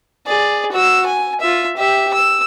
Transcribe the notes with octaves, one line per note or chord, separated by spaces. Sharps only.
G#4 D5
F#4 E6
G#5
F4 E5
G4 E5
E6